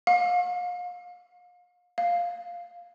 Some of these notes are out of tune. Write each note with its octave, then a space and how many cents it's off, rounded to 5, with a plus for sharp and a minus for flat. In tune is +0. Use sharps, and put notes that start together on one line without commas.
F5 +40
F5 +5